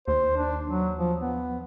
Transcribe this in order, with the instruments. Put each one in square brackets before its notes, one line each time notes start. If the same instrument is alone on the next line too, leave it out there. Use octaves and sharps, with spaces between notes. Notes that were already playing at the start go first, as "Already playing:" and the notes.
[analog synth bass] D#2 [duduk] C5
[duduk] D4
F#3
F3
B3